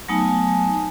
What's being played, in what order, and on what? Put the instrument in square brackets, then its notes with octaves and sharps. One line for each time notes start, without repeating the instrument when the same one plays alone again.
[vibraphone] F#3 A3 B3 D#4 G#5 A5